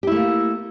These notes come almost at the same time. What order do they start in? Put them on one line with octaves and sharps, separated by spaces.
G4 E4 A3 A#3